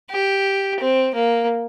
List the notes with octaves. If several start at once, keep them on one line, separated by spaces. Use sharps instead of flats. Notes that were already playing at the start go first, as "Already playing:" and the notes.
G4
C4
A#3